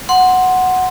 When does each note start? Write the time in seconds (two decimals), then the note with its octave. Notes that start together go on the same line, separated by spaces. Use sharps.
0.09 F#5 C6